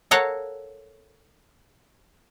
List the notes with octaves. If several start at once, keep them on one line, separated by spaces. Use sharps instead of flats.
A4 A#4 C#5 F5 F#5 A#5